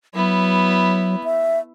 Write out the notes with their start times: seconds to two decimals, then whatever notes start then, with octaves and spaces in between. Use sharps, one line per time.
0.15 F#3 B3 E4
1.24 E5